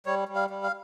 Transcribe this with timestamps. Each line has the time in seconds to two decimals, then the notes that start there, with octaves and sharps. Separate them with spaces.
0.06 G3 C#5
0.28 G3
0.35 F5
0.50 G3
0.63 F5